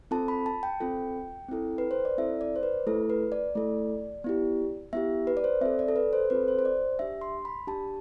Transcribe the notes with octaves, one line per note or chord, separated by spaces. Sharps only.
C4 F4 A4 A5
B5
A5
G5
C4 F4 A4
C4 E4 A4
B4
C5
D5
C4 E4 A4 E5
D5
C5
B4
A3 E4 A4
B4
D5
A3 E4 A4
B3 E4 G4
B3 E4 G4 E5
B4
D5
C5
C4 F4 A4 E5
D5
A4
B4
C5
C4 F4 A4 B4
C5
C5
D5
D4 G4 E5
C6
B5
D4 G4 A5